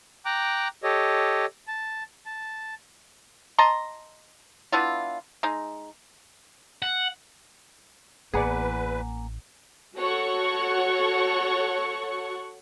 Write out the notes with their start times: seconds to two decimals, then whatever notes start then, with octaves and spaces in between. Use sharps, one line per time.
0.25 G5 A#5 D6 F#6
0.83 G4 A4 C#5 D#5
1.68 A5
2.26 A5
3.59 D#5 A5 A#5 C6
4.72 B3 D4 E4 F4
5.43 G#3 D#4
6.82 F#5
8.34 A1 E2 A#3 G#4 B4 D5 F#5 G#5
9.98 F#4 A4 C#5 F#5 C#6